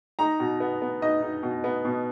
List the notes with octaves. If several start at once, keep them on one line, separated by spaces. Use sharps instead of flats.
D#4 A#5
B2
B3
B3
D#4 D#5
D#4
B2
B3
B2